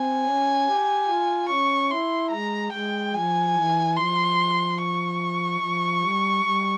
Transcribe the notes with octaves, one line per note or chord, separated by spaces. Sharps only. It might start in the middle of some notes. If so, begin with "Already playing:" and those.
Already playing: C4 G#5
C#4
G4
F4
C#4 C#6
E4 C6
G#3 A#5
G#3 G5
F3 G#5
E3
F3 C6
C#6
F3
G3
G3